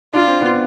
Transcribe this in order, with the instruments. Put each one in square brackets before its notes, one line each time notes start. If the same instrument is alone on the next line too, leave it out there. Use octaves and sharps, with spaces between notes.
[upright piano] D4 [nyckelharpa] F4
[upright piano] C4
B3 D4